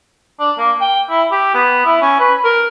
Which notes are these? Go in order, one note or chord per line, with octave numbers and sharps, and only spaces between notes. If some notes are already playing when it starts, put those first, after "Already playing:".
D4
A#3
G5
E4
G4
B3
E4
C#4
B4
A#4